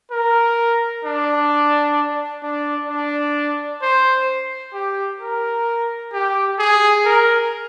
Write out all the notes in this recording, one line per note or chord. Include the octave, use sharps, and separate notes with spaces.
A#4
D4
D4
D4
C5
G4
A#4
G4
G#4
A#4